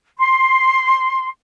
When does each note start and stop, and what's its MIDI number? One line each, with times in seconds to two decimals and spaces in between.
0.19 1.28 84